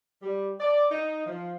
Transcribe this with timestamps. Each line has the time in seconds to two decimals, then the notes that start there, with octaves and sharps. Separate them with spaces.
0.22 G3
0.60 D5
0.91 D#4
1.26 F3